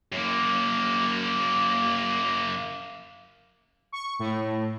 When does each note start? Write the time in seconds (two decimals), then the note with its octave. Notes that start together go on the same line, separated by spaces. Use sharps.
0.12 F#2 A#3
3.92 C#6
4.19 A2